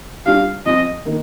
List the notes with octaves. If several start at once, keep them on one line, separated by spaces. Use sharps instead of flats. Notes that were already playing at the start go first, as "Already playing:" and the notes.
G3 D4 F4 F5
F3 C4 F4 D#5
D#3 A#3 D#4